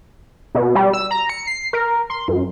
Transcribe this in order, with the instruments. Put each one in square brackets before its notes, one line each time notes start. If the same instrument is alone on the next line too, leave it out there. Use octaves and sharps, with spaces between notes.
[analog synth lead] B2
G3
E6
A#5
C#7
C7
A#4
C6
F#2